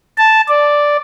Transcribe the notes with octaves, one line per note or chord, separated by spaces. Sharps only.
A5
D5